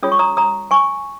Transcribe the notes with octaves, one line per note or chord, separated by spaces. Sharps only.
C#4 F4 G#4 C#5 D#6
C#6
A#5 D#6
A#5 D#6
G#5 C#6